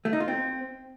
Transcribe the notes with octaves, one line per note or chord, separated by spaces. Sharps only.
A3
D#4
F4
C4